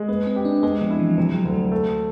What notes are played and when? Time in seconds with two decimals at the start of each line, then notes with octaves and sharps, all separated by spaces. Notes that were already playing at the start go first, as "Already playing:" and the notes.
Already playing: G#3
0.08 A#3 B3
0.27 C4
0.36 G4
0.45 D4
0.63 G#3 B3
0.82 F3
0.90 E4
0.99 E3
1.09 F#3
1.18 C3 F3
1.35 F#3
1.45 D2
1.54 F#3
1.72 A3